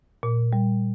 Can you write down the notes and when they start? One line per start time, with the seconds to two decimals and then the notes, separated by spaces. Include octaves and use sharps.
0.23 A#2
0.53 G3